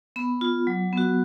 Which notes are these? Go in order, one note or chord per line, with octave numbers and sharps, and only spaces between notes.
B3 B5
F4
F#3
B3 F#4